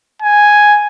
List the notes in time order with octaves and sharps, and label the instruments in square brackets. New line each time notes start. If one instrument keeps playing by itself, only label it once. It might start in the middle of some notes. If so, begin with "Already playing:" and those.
[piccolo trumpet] G#5